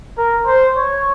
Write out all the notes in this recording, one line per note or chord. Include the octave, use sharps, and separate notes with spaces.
A#4
C5
C#5